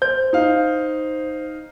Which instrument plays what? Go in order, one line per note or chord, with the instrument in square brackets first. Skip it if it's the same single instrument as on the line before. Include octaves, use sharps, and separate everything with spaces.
[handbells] C5 [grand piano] G6
[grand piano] D#4 F5